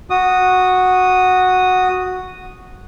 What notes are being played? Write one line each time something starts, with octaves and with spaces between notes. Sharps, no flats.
F#4 D#6